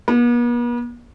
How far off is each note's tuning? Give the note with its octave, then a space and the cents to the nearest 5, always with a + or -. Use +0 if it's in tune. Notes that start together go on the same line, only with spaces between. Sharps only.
B3 -45